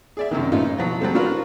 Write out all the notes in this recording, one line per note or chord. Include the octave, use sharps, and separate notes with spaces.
G#4 D5 E5
F#2 C3 D#3
A2 E3 C#4 D#4 F4
B2 F3 F#3
F#3 G3 C4 A4
D4 F4 F#4 A#4 B4